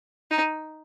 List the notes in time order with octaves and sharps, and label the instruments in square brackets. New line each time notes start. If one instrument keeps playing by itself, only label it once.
[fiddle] D#4